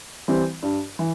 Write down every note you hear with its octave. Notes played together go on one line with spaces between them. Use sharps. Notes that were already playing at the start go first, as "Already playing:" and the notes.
E3 G3 C4
G2
E3